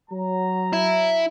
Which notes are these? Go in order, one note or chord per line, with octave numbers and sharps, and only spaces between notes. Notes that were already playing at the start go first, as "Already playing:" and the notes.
F#3 A#5
E4